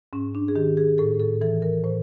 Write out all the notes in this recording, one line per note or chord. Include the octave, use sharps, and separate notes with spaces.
G#2 C#4
D4
G#4
D#3 G4
G#4
A2 A4
A4
E3 A4
A#4
A2 C5